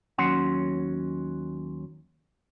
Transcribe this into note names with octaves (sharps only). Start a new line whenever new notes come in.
D#2 F#3 C#4 F#5 C6